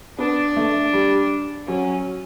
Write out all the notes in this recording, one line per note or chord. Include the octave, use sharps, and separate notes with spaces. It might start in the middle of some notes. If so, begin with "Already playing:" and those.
B3 D4
A3
G3
F#3 C#4